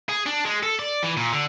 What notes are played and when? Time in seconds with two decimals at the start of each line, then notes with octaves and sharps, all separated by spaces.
0.09 G#4
0.26 D4
0.45 G#3
0.63 A4
0.79 D5
1.03 E3
1.17 A#2
1.33 D3